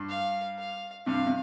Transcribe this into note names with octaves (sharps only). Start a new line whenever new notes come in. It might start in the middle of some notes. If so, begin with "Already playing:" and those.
Already playing: G2
F5
F5
G2 C3 F5
C3